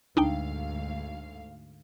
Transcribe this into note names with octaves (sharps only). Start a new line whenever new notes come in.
D2 G#2 D4 D#4 F5 G5